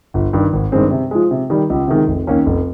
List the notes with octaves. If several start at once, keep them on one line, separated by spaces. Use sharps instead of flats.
G1
G2 D#3
G#1
G2 D#3 G#3 C4
C3
F3 G#3
C3
D#3 G3
C#2
C3 D#3 G#3
F1
D#2 D#3 A#3 C#4
F1